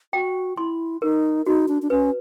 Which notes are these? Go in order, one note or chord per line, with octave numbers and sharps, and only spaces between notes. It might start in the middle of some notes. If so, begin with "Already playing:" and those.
F#4 G5
E4 C6
D#4 A#4
D#4 F#4
D4
D4
C#4 B4